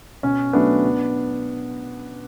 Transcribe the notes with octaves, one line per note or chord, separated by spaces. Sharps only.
B2 C#4
F#3 A3 B3 D4
B2